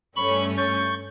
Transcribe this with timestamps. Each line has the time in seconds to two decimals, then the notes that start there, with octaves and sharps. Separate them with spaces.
0.16 G2 A3 C#4 B5 C#6
0.57 C#6 G6 A6